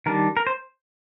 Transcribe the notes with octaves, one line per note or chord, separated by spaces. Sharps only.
D#3 G3 D4 A#4
A#4
C5